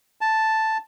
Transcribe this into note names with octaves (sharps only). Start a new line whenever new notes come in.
A5